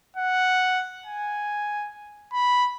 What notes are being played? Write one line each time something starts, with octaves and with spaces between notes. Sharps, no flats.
F#5
G#5
B5